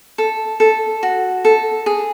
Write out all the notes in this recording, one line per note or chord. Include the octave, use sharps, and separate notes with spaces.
A4
A4
F#4
A4
G#4